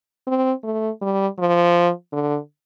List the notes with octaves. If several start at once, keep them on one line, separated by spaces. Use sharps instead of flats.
C4
A3
G3
F3
D3